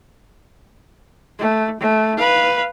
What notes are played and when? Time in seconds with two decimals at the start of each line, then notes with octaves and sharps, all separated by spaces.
1.39 A3
1.80 A3
2.17 B4 F5